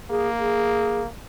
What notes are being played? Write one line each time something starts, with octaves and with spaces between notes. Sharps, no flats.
A#3 G#4
G#4